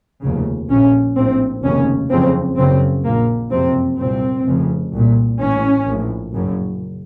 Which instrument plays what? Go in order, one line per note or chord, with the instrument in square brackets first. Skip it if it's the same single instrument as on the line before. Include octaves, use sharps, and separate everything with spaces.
[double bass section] F1 D#2 C#3
A#1 A#2 C#4
A#1 A2 C4
F1 D#2 C#3 C#4
F#1 F2 C#3 C4
F#1 F#2 C#3 C4
A#1 A#2 A#3
F#1 F2 C3 C4
C2 A#2 C4
F1 F2 C#3
C2 A#2
A1 A2 C#4
A#1 A2
F#1 F#2 C#3